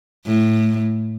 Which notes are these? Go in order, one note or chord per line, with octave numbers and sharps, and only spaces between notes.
A2